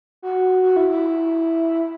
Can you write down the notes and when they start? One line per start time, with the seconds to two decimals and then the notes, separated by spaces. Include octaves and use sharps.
0.22 F#4
0.63 F#4
0.76 E4
0.89 E4